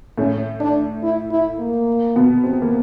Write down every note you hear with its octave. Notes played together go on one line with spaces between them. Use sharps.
A2 A3 C#4
D4
E4
E4
A#3
B2 B3
C3 C4
A#3